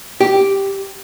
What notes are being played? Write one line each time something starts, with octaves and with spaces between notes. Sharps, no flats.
G4